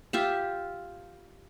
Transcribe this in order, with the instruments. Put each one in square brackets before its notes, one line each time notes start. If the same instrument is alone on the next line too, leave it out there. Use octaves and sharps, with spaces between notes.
[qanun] F4 G4 E5